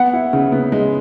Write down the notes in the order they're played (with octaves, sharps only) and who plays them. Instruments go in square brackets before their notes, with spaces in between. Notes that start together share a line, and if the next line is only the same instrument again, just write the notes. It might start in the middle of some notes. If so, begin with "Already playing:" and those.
Already playing: [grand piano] B3 [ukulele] F#5
[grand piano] E4
C#3
B3
G#3